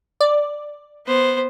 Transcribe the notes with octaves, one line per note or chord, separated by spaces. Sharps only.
D5
B3 C5